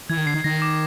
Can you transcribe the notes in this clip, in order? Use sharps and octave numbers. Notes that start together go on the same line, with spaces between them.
E3 G#6
D#3
D3 C7
D#3
D#3 A#6
D6